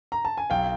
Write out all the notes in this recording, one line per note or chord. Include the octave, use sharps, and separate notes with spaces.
A#5
A5
G#5
B1 F5 G5